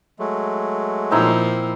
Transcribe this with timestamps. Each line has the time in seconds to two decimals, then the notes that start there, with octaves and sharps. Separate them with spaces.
0.19 F#3 G#3 A3
1.11 A#2 F3 A#3 C4 D#4 E4